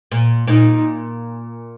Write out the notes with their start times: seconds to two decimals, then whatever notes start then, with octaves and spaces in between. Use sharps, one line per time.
0.12 A#2
0.47 A#2 D#4